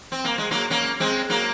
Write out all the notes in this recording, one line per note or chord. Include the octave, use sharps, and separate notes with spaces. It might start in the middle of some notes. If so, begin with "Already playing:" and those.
C4
A#3
G#3
F#3 A#3
A#3 C#4
G#3 C4
F#3 A#3